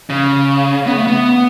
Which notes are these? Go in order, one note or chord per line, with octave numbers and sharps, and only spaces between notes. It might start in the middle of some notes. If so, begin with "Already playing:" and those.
C#3
B3
A3
B3